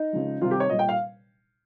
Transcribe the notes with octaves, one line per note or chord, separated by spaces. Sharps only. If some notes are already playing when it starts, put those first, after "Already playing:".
Already playing: D#4
C#3 F3 G#3
C3 D#3 G3 F4
G4
C#5
A#2 G3 D#5
G5
F5